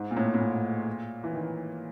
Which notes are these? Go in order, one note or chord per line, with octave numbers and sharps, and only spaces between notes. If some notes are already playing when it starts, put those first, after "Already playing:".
Already playing: G#2
A#2
A2
A2
A#2
E3
D#3